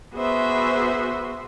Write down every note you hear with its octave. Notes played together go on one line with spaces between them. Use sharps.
B3 F#4 G#4 C5 E5